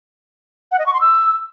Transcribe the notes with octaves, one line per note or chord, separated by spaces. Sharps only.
F#5
D#5
C#6
C6
E6